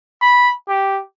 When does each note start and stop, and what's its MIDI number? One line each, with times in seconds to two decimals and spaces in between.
0.22 0.50 83
0.68 1.00 67